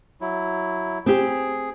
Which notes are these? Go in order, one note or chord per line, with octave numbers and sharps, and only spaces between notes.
F#3 E4
C4 G4 G#4